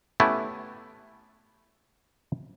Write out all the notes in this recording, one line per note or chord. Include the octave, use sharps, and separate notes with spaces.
A3 B3 C#4 E4 G4